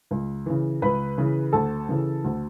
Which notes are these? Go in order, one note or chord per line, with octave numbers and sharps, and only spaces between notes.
C#2
C#3 E3
C#2 B4 B5
C#3 E3
D2 A4 A5
C#3 E3
D2